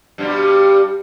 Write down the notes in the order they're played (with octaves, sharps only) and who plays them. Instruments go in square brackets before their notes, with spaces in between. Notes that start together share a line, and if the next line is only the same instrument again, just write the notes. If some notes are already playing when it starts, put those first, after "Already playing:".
[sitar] G2 B2 G3